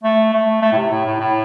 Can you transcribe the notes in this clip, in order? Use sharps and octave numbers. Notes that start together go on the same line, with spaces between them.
A3
A3
A3
A2
C3
A2
A2
A2